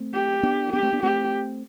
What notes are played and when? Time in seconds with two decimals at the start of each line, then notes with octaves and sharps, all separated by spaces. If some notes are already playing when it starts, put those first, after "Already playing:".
Already playing: A3 C4
0.14 G4
0.43 B3 D4
0.73 B3 D4 G4
0.83 A3 C4
0.93 B3 D4
1.03 A3 C4 G4